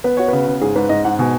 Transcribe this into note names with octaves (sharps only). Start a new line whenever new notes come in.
B3 B4
F#4 C#5
C#3 B4
C#3
G#2 G#4
G#2 B4
G#2 D#5
G#2 F#5
B2 G#5